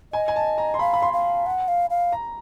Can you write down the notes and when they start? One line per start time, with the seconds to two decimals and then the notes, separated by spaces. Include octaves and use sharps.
0.13 D#5 G#5
0.28 G#5
0.36 A5
0.58 A#5
0.74 C6
0.79 F5 B5
0.94 B5
1.02 C6
1.13 F5
1.46 F#5
1.68 F5
1.90 F5
2.12 A#5